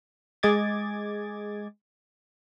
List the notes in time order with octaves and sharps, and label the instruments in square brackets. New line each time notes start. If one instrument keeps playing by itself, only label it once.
[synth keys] G#3 G#4 D#5 D6 G#6 A6